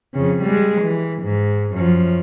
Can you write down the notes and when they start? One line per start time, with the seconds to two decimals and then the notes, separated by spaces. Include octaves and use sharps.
0.14 F2 C#3
0.42 G3 G#3
0.81 E3
1.23 G#2
1.74 F#2 F3